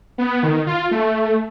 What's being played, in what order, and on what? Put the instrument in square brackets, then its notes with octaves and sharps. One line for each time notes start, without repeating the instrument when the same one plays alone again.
[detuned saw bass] B3
D#3
F4
A3